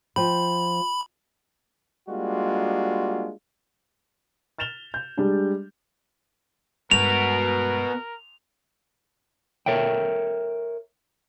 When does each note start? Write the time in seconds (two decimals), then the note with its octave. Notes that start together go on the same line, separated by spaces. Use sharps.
0.16 F3 G5 B5
2.09 G3 G#3 A#3 D4 F4 F#4
4.58 F6 A6 E7 F7 G7
4.94 G6
5.17 G3 G#3 D4 G4
6.91 G2 G#3 B3 F#4 A#4 F7
9.66 A4 A#4 C#5 E5 G5